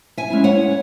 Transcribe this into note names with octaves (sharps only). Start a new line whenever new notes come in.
E5 G#5
G#3 C#4 E4
C#5 F#5